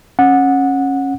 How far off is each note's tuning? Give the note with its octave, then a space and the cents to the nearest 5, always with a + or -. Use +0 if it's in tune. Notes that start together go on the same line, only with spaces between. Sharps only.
C#4 -20 F#5 -15